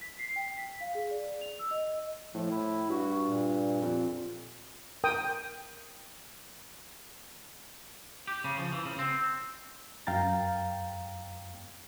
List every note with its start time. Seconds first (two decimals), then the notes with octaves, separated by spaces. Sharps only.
0.01 B6
0.19 C7
0.36 G5
0.57 B6
0.81 F5
0.95 G#4
1.11 D5
1.41 F7
1.59 E6
1.71 D#5
2.34 A2 F3
2.51 A2 E4
2.90 G2 F#4
3.26 A#2
3.82 F2
5.04 A#4 G5 D#6
8.28 G4
8.44 C#3
8.58 F3
8.72 E3
8.85 C#3
8.99 C4
10.07 F#2 F5 G5 A#5 A6